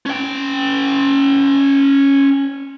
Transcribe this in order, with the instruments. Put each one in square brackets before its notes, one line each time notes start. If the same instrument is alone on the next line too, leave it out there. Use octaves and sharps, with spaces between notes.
[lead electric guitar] C#4 G5